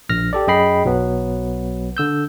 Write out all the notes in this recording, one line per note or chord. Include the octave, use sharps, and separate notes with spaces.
A#1 F6 A#6
G4 A4 D5
F#2 G#4 D#5 G5 B5 C7
B1 F#3 B3
D3 E6 G6